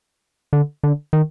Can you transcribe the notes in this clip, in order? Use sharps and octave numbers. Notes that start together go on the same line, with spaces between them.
D3
D3
D#3